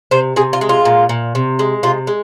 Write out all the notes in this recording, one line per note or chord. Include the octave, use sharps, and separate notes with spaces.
C3 C5
C3 G#4
F4
G#3
F4
A#2
A#2
C3
G#3
C3 F4
G#3